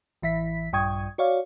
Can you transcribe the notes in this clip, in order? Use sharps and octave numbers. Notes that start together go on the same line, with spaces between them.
A1 E3 E5 B6
A#1 G2 G5 C#6 D#6 G#6
F#4 C#5 D5 F5